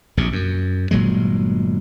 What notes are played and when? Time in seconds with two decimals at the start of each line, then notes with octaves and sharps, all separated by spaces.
0.17 A#1 F2 C3
0.33 F#2
0.91 G1 A#2 F#3 G#3